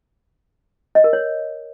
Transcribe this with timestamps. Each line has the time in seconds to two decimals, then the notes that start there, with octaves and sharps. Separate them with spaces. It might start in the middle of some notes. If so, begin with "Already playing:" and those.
0.95 D#5
1.04 A#4
1.13 C#5